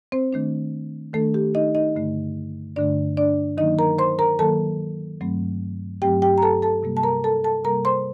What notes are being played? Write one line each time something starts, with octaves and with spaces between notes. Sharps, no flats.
C4 C5
D#3 A3 D4
D#3 A3 D4 A4
G4
D#4 D#5
D#4 D#5
G2 D3 A3
G2 D3 A3 D4 D5
D4 D5
D#3 F#3 A#3 D#4 D#5
A#4 A#5
C5 C6
A#4 A#5
D#3 F#3 A#3 A4 A5
G2 F#3 A3 C4
G2 F#3 A3 C4 G4 G5
G4 G5
A#5
A4 A5
A4 A5
C3 G3 A#3
A5
A#4 A#5
A4 A5
A4 A5
C3 G3 A#3 A#4 A#5
C5 C6